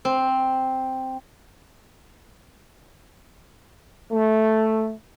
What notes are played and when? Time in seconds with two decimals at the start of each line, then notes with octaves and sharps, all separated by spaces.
0.05 C4
4.12 A3